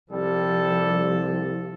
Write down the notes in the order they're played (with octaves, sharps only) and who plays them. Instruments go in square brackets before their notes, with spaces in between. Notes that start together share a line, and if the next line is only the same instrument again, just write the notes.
[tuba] C2 [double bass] F3 [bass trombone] G3 [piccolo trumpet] A4